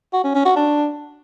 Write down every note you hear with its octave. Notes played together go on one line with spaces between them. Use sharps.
F#4
C#4
C#4
F#4
D4